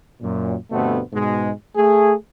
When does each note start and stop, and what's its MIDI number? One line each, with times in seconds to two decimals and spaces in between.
0.22 0.55 42
0.22 0.55 46
0.70 1.00 43
0.70 1.00 47
0.70 1.00 50
0.70 1.00 57
0.70 1.00 59
0.70 1.00 60
1.13 1.52 44
1.13 1.52 47
1.13 1.52 56
1.77 2.13 57
1.77 2.13 68